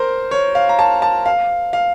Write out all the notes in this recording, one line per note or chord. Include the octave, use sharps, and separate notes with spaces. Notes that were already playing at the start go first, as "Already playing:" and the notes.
Already playing: A#4 C5
C#5
F5
A#5
A5
A5
F5
F5